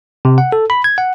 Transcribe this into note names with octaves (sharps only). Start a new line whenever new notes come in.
C3
F#5
A4
B5
G#6
F#5